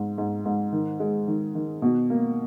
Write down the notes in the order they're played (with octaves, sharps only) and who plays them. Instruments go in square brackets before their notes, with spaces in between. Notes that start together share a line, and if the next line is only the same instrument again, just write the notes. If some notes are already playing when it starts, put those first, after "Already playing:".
Already playing: [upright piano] G#2
G#2
G#2
D#3
G#3
D#3
D#3
B2
A#3